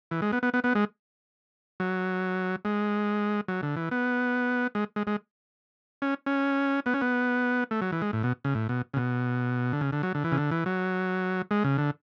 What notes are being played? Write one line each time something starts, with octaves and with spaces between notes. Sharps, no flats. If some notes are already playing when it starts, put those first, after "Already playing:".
E3
G#3
B3
B3
B3
B3
G#3
F#3
G#3
F#3
D3
E3
B3
G#3
G#3
G#3
C#4
C#4
B3
C#4
B3
A3
F#3
E3
G#3
A2
B2
C#3
A2
B2
C#3
B2
D3
C#3
D3
F#3
D3
E3
C#3
D3
E3
F#3
G#3
C#3
D3